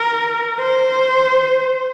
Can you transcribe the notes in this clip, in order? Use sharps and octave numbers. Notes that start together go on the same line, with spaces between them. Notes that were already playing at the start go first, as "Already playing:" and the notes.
Already playing: A#4
C5